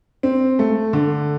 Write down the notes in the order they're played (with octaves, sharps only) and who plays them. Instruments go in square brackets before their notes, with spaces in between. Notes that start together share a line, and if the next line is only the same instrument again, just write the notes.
[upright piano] C4
A3
D3